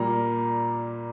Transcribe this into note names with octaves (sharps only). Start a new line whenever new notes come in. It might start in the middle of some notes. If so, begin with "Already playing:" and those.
Already playing: A#2 G3 A#3 A#5